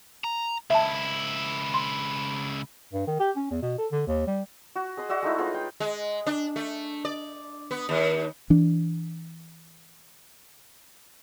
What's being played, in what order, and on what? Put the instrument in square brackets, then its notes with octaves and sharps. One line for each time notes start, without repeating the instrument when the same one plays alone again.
[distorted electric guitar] A#5
[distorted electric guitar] C#2 E4 [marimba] E5 A5
[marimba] C6
[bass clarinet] G2
D#3
G4
C#4
E2
B2
A4
D3
D#2
G3
[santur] F#4
G#4 D#5 C6
F#4 D5 E5 F#5
G#3 A3 D#4 E4
F4 G#4 B4 C#5
G5
[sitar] G#3
D4
A3
D5
B3
D#2
[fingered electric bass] E3 D4